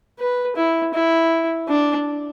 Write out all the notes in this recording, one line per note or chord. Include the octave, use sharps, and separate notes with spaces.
B4
E4
E4
D4